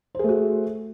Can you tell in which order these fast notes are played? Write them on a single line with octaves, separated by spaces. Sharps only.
C5 G#4 A3 F#4